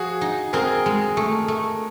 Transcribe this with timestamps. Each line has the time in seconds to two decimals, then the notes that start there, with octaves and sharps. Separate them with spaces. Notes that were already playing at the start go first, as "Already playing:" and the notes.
Already playing: F3 F#4 G#4
0.21 D#4
0.53 C4 G#4 A#4
0.86 G#3
1.17 A3
1.48 A3